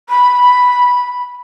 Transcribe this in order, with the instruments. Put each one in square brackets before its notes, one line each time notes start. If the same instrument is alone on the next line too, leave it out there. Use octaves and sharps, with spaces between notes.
[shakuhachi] B5